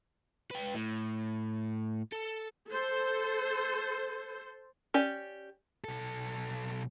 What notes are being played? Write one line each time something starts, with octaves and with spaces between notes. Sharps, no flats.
B4 G5
A2
A4
A4 C5
C#4 G4 D5
B1 A4